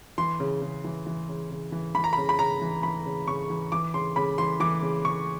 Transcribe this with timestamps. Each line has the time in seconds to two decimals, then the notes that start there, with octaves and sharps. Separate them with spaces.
0.18 E3 C6
0.40 C#3
0.62 C#3
0.84 E3
1.06 E3
1.29 C#3
1.51 C#3
1.72 E3
1.95 E3 B5
2.04 A#5
2.13 C#3 B5
2.29 B5
2.39 C#3 A#5
2.62 E3
2.83 E3 B5
3.06 C#3
3.28 C#3 C#6
3.50 E3
3.72 E3 D6
3.94 C#3 C6
4.16 C#3 B5
4.38 E3 C6
4.60 E3 D6
4.82 C#3
5.05 C#3 C#6